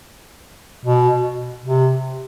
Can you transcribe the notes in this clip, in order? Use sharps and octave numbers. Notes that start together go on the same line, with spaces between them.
B2
C3